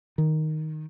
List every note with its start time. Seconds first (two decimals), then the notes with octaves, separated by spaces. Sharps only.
0.18 D#3